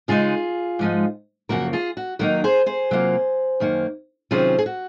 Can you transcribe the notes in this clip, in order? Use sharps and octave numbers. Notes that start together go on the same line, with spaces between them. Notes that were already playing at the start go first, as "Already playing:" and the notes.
C#3 G#3 C4 D#4 F4 G#4
G#2 F3 G#3 D#4
F#2 C#3 F3 A#3 F#4 A#4
F4 G#4
F#4
D#3 F#3 A#3 D#4 F#4 A#4
G#4 C5
G#4 C5
C3 F#3 A#3 F4
F#2 D#3 A#3
C3 D#3 F#3 C#4 F4 G#4 C5
G#4
F#4